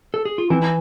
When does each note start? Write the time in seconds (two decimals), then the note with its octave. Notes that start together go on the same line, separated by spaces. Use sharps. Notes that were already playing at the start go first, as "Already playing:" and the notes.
0.14 A4
0.25 G#4
0.38 F4
0.50 E3 C4 E4
0.62 E4